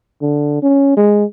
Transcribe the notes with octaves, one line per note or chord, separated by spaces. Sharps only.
D3
C#4
G#3